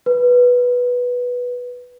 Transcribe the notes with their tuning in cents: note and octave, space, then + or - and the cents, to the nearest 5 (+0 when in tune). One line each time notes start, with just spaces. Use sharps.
B4 -10